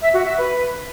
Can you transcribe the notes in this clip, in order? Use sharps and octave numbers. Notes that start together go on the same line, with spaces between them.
E5
F#4
E5
B4